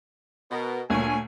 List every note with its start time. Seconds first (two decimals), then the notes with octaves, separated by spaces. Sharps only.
0.51 B2 B3 A#4
0.90 D2 A#2 C#5 G#5